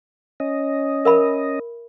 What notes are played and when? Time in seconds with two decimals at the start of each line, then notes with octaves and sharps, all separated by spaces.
0.40 C#4 D#5
1.05 A#4 E5 B5